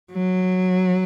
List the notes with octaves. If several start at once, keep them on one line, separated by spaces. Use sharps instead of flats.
F#3